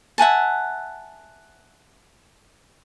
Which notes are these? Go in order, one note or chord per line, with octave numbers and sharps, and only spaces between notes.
E5 F#5 G#5 A5